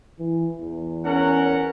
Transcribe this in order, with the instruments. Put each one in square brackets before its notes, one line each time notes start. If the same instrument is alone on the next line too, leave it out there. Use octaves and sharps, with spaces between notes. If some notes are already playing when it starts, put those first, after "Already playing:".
[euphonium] E3
E2
[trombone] C#4 [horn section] A#4 F#5